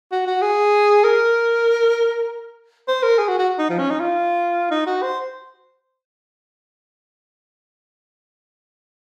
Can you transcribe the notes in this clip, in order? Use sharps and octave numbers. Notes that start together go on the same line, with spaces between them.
F#4
F#4
G#4
A#4
C5
A#4
G#4
F#4
F#4
D#4
F3
C#4
D#4
F4
D#4
F#4
C5